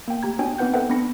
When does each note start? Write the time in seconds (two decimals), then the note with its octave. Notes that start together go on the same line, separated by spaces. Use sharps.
0.08 A#3 G5
0.23 A3 G4 A#5 G#6
0.39 B3 D4 F#4 C#5 G5 G#5
0.58 B3 C4 D#4 B4 F#5 G6
0.73 A4 B4 C5 E5 F#5 G5
0.90 B3 D4 B5 A#6 C#7